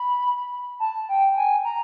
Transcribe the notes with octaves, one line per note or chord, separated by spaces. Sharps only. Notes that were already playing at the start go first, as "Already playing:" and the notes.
Already playing: B5
A5
G5
G#5
A#5